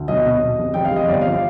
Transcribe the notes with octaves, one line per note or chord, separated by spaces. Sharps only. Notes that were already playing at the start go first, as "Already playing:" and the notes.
Already playing: D2
B1 D#5
B2
B2
F1
F1 G5
F5
F1 D#5
G1 D5
F5
F3
F5